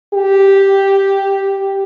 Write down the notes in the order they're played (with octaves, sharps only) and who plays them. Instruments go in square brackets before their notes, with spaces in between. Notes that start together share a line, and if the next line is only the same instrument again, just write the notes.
[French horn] G4